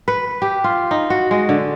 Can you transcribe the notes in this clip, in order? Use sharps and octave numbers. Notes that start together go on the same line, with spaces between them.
B4
G4
F4
D#4
F#4
G#3
D3